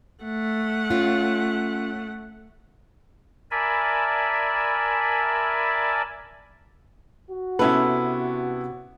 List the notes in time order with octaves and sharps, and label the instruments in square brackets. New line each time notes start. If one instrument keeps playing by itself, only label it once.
[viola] A3 F#5
[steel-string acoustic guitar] C#4 F4
[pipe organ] A#4 D5 E5 G#5 A5 B5
[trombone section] F#4
[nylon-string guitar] C3 C#4 B4 [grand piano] B3 E4 A4